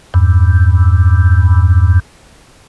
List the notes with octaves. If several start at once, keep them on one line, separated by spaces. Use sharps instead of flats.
E2 G2